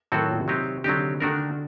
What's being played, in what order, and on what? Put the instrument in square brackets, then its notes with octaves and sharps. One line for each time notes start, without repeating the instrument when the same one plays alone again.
[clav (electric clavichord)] A2 F#3 C4 F#4 A4 [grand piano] D#3
[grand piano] A#2
C3
[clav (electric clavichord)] F#3 C4 D#4 G4
[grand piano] D3 [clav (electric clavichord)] F#3 C4 D#4 G4
[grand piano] D3 [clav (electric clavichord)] D#3 A3 D4 F#4 A#4